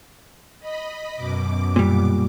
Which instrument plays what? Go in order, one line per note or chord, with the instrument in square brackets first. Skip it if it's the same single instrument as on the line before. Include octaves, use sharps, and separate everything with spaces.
[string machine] D#5 B5
F#2 B2 D6
[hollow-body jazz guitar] A#2 G3